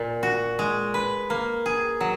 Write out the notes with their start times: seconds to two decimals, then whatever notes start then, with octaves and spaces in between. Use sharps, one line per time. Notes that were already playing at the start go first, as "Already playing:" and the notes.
Already playing: A#2
0.23 F#4
0.59 G#3
0.94 B4
1.30 A#3
1.66 G#4
2.01 F#3